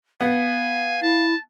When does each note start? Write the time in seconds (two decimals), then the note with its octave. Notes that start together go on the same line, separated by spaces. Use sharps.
0.21 B3 F5 G#5
1.02 E4 A5